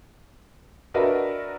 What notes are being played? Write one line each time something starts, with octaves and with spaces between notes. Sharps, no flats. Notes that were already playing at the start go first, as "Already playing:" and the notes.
D4 F#4 A#4 B4 D#5 E5